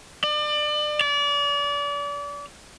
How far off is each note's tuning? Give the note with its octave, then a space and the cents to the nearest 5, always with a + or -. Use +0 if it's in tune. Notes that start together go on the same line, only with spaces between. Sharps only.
D5 +30
D5 -35